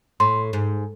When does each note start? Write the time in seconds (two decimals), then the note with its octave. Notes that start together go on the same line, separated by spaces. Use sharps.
0.20 A2 C6
0.53 G#2